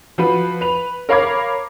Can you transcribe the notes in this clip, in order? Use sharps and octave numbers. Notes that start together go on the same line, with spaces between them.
F3 F#4 B4
B4 F7
A#4 C#5 F5 B5 D6 G#6